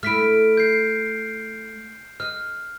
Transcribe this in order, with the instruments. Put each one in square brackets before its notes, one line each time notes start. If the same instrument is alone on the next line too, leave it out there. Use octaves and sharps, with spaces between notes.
[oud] A3 E4 [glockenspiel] F6 B6 D7
[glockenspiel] G6 C7
[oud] D#5 [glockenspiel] F6